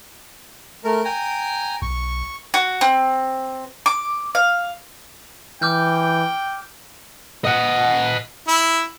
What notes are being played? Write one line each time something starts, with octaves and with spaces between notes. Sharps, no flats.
A3 A#4
G5 G#5 A#5
B1 C#6
F#4
C4
D6
F5
E3 G5 D6 F6 G6
D#5 F#5
E4